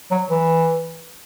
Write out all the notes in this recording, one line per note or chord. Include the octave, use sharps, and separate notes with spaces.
F#3
E3